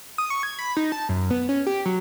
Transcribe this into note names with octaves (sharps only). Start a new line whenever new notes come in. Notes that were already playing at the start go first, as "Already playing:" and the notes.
D#6
C#6
G#6
B5
D#4
A5
F#2
B3
C#4
G4
F#3